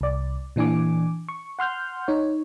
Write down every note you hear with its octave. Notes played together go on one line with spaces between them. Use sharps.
C2 D5
A#2 E3 D4 G#5 D6
C#6
F#5 C6 F6 G6
D#4 C#5